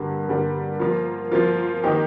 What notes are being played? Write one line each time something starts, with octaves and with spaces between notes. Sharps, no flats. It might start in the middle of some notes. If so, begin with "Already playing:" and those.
Already playing: G2 D3 G3 A#3
G2 D3 G3 A#3
F3 A#3 F4
F3 A#3 F4
D#3 A#3 D#4 G4